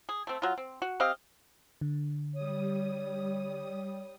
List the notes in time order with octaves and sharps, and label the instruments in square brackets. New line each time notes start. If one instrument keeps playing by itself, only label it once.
[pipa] G#4
A3 C4
F#3 F4
C4
F#4
C4 G4 D#5 F5
[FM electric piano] D3
[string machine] G3 D#6 [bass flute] C#5